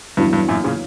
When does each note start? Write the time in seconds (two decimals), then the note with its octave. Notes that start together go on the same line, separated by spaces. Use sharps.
0.17 E2 G2 D3 F#3 C#4 E4
0.33 G2
0.48 F#2 A#2
0.64 A#2 C#3